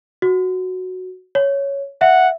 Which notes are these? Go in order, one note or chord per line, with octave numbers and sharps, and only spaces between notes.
F#4
C#5
E5 F#5